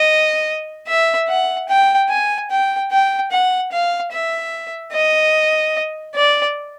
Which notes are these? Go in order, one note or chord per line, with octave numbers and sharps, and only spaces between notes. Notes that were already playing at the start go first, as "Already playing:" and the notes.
Already playing: D#5
E5
F#5
G5
G#5
G5
G5
F#5
F5
E5
D#5
D5